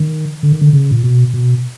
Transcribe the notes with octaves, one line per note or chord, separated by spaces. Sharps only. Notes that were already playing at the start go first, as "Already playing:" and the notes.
Already playing: D#3
D3
D#3
D3
C#3
A#2
B2
B2